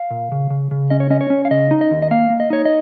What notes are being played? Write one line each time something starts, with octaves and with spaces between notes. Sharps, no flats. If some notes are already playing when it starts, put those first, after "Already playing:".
Already playing: F5
A#2
C#3
C#3
C#3
C#4 D#5
C#5
C#4 D#5
C#5
C#4
F5
C#3 D#5
D#4
D#5
D#2
D#5
A#3 F5
A#3
D#5
D#4 C#5
D#5